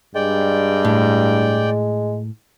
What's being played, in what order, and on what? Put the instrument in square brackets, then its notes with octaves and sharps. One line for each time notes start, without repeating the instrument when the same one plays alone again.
[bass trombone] G2 [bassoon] G#3 [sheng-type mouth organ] D5 G5
[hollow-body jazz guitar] A2